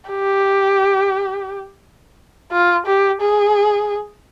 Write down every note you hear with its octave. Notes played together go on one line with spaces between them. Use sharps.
G4
F4
G4
G#4